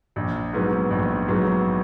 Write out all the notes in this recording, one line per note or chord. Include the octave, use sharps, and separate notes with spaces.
A#1
G#2 F#3 B3
A#1
G#2 F#3 B3